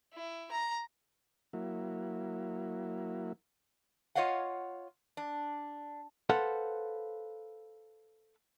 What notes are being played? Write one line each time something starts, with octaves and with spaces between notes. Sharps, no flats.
E4
A#5
F#3 A#3 E4
F4 C#5 D#5 F5 F#5
D4
A4 B4 C5 F5 F#5